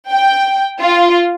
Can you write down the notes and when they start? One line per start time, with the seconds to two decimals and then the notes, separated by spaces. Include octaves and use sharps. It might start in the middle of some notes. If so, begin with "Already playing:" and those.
0.12 G5
0.81 F4